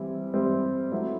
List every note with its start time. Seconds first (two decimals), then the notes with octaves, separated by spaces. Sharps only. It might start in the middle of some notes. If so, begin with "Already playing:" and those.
Already playing: E3 G3 C4 E4
0.33 E3 G3 C4 E4
0.92 F#3 A3 C4 E4